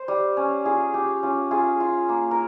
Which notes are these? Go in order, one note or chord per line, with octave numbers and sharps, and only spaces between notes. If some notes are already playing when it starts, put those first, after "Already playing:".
Already playing: C5
G3
C#4
F4 G#4
C#4 G4
C#4 F4
F4 G#4
F4
A#3
A#4